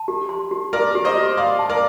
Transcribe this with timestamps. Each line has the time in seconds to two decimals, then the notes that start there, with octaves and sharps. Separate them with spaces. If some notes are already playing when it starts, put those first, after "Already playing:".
Already playing: A5
0.08 G4
0.29 C6
0.51 G4
0.73 G4 A#4 D5
0.95 G4
1.05 C5 D#5
1.16 G4
1.37 D5 F5 C6
1.59 A5
1.69 A#4 D5